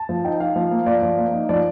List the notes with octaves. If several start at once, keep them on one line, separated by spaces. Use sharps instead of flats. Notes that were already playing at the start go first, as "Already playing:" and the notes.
Already playing: A5
F3
D#4 G5
D#4 F5
F3
A#3
F3 D5
F3
A#3
D#4
F3 D5